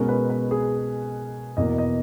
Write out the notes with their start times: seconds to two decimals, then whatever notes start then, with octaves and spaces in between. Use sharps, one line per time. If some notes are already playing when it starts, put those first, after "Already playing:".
Already playing: B2 G#3 C#4 A#4
0.08 B4
0.30 B4
0.51 G#4
1.57 E2 B2 A#3 D#5
1.78 D#5